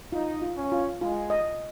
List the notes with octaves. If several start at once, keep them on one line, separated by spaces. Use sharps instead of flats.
D#4 F4
F4
C#4
F4
G#3 F4
D#5